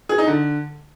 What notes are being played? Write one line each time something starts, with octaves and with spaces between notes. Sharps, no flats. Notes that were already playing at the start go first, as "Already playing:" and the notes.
G#4
D#4
D3